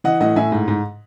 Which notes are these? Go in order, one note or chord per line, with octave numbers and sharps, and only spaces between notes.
E3 D#5 F#5
A2 D#5 F#5
A2 E5 G#5
G#2
G#2